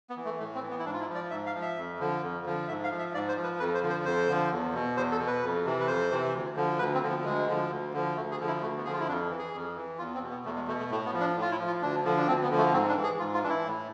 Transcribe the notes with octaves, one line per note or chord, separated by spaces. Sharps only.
B3
E3
A3
A2 A3
C4
E3
B3
E4
G#2 D4
F4
E4
F3
D5
G#2 E5
F5
F3
E5
F2
D3 F3
F2
D3 F3
G#2 E5
F5
F3
E5
G#2 D5
C5
F3
B4
F2 B4
C5
D3 F3
C5
F2 C5
D3 F3
E2
B2
E2 C5
A4
B2
B4
F2
C3 E3
B4
F2 C5
C3 E3
D2
D3 F3
D2 B4
C4
D3 F3
B3
D2 G#3
D3 F3
D2
D3 F3
D2 A3
G#4
D3 F3
E4
D2 A3
B3
D3 F3 G#4
F4
E4
F2 D4
E3
G#4
F2
E3
E2 F4
C4
B2
B3
E2 A3
G#3
B2 A3
A3
A2 A3
B3
F3
D4
A2
F4
E4
F3
F4
D2 D4
D3 F3
D4
D2 C4
B3
D3 F3
A3
G#2 C4
D4
E3
G#4
G#2 F4
F4
E3 D4
E4
A2